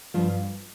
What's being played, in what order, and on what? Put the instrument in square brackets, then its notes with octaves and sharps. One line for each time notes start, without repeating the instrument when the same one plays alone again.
[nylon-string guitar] G2 F3 F4